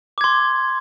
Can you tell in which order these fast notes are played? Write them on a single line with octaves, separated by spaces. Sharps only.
D6 G#6 C6